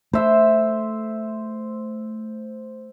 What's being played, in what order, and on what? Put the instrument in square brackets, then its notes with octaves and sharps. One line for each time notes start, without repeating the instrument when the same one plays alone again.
[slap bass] A3 [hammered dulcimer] C5 E5